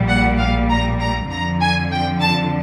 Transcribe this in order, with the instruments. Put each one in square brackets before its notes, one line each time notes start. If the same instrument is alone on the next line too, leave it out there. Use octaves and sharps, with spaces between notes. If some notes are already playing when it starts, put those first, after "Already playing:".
Already playing: [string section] A#1 A#2 G3
F#5
F5
A#5
A#5
F2 D3 F3 A#5
G#5
G5
A5